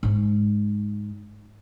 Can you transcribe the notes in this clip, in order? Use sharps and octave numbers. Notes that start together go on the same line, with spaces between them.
G#2 G#3